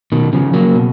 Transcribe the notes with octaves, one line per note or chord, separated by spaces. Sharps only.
B2 D#3
C#3 F3
F#3 A#3
B2